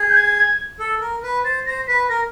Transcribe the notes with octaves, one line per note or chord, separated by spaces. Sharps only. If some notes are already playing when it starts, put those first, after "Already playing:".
Already playing: G#4
G6
G#6
A4
A#4
B4
C5 A6
C5 A#6
B4 B6
A#4 A#6